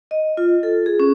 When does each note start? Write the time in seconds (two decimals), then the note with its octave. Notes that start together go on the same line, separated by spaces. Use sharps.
0.11 D#5
0.37 F4
0.63 A4
0.86 G#4
1.00 C#4